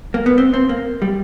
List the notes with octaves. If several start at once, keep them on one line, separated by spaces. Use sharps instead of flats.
A#3
B3
C4
C4
A#3
G3